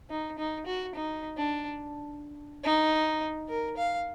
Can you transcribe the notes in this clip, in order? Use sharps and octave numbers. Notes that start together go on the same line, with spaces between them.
D#4
D#4
F#4
D#4
D4
D#4
A#4
F5